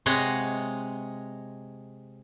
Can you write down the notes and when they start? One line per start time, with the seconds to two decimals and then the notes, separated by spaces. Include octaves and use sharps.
0.06 C3 G#3 C#5 D#5 F#5